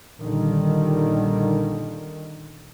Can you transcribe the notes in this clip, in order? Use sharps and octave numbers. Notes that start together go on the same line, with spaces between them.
A#1 A#2 D3 D#3 G3